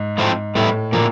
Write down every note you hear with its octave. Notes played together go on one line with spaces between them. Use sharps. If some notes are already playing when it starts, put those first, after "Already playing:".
Already playing: G#2
A2 F3 A3 C4
A2 G3 B3 E4
A#2 D3 F3 A#3